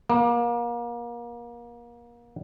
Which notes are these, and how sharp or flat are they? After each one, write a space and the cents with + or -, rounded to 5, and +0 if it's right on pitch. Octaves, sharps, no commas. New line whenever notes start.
A#3 +30